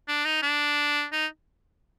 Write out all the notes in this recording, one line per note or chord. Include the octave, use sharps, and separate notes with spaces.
D4
D#4
D4
D#4